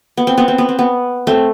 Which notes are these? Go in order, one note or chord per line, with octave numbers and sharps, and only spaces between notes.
B3
C4
B3
C4
B3
C4
B3
A3 C4